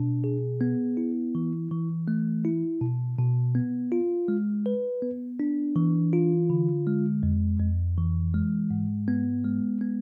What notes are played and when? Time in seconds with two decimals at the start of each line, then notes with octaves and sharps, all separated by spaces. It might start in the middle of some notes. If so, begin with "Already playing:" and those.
Already playing: B2 D4
0.24 G#4
0.61 B3
0.97 E4
1.35 E3
1.71 E3
2.08 A3
2.45 E4
2.81 B2
3.19 B2
3.55 B3
3.92 F4
4.28 G#3
4.66 B4
5.02 B3
5.40 D4
5.76 E3
6.13 F4
6.50 D3
6.87 G#3
7.23 F2
7.60 F2
7.98 E3
8.34 G#3
8.71 G#2
9.08 B3
9.45 G#3
9.81 B3